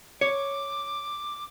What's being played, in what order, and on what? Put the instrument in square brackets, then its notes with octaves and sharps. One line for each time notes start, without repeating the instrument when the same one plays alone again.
[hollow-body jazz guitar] C#5 [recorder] D6